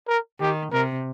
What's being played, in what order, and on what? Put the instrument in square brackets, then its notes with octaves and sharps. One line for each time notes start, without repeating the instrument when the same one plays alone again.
[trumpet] A#4
[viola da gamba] D#3 [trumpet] G4
[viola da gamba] C3 [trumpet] A#4